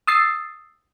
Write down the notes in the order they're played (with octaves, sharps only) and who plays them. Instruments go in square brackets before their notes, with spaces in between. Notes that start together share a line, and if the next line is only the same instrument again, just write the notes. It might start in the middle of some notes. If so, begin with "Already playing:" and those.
[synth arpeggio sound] D#6 E6 A6 C7